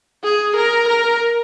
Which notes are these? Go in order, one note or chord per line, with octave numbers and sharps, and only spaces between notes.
G#4
A#4
A#4